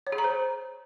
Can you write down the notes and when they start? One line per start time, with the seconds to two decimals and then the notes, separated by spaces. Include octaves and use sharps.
0.07 C#5
0.12 G#4
0.18 A#5
0.24 C5